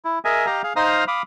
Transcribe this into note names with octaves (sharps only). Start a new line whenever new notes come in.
E4
G#4 A#4 D#5 E5 G#5
G4 D#5 F5 A#5
G#4 F5
D#4 C5 F5 A#5 D#6 F6
F5 B5 D6 D#6